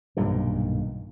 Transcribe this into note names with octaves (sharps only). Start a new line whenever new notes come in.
B1 G2 A#2 D#3